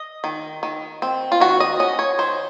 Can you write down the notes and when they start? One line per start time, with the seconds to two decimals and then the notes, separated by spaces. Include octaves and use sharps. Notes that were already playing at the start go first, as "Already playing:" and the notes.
Already playing: D#5
0.24 D#3
0.63 D#3
1.02 C4
1.32 F4
1.40 D#3 F#4
1.60 D#5
1.79 C#4 D#5
1.99 C#5
2.19 D#3 C5